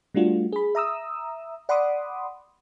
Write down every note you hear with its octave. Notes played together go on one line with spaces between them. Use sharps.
G3 A3 D4 F4 F#4
G#4 B5
E5 A#5 D#6 E6
D5 F#5 B5 C6 D6 D#6